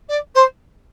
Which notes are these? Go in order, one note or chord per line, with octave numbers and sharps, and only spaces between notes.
D5
C5